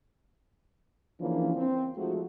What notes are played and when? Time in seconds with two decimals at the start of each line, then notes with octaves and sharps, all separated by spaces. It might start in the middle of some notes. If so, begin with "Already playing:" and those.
1.21 C#3 E3 F3 A#3 C#4 D4
1.56 C4
1.97 F3 G#3 A3 D#4 F4 F#4